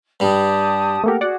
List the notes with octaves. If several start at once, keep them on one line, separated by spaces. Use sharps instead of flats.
G2 G3 G4 A5 D#6
A3 A#3 G4 A4 A#4 F#5
F#4 G#4 D5 F#5